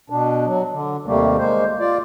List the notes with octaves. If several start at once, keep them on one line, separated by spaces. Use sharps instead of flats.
B2 D4
F#3
D3
D#2 C3 G3 A3 A#3
G#3 A#3 C5
F4 D5